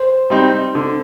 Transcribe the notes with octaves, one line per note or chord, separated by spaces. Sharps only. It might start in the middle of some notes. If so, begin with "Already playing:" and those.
Already playing: C5
G3 C4 D#4
D3